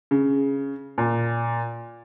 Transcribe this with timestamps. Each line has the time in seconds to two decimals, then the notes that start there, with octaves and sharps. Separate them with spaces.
0.11 C#3
0.98 A#2